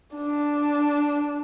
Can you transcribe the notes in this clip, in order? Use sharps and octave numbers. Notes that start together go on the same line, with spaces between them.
D4